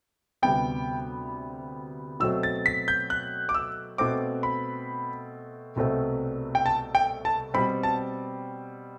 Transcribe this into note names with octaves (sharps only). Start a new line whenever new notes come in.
D2 C3 G3 B3 G5
B2 F#3 A3 C4 E6
A6
B6
G6
F#6
D6
E6
B2 A3 C4 D6
B5
C2 B2 A3 C4
G5
A5
G5
A5
B2 G3 C4 B5
A5